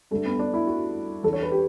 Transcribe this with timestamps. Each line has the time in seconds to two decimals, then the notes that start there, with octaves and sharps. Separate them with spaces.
0.11 G2 D3 A3
0.25 B3
0.39 D4
0.54 E4
0.67 F#4
1.24 E2 A4
1.27 D3
1.33 C#5
1.43 B4
1.52 G4